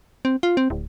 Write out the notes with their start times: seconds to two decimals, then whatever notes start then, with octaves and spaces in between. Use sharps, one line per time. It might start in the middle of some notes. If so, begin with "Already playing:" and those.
0.25 C4
0.43 F4
0.57 C4
0.70 D1